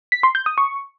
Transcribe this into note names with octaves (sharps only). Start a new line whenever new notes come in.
B6
C6
G6
D#6
C#6